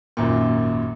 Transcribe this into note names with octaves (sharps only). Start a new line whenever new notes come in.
G#1 F#2 A#2